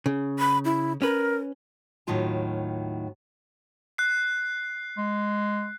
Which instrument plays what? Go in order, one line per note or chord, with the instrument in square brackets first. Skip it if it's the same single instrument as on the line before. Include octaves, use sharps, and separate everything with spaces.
[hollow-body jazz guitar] C#3
[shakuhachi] B5
E4
[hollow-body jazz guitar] C#4 B4 [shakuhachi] A#4
[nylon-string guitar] D#2 A2 D#3 F#3 F4 A5
[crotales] F#6 C7
[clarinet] G#3